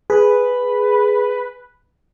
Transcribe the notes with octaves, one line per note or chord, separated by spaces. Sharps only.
G#4 B4